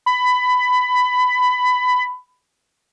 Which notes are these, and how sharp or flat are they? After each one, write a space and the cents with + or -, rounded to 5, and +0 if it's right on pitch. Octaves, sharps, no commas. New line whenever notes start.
B5 +15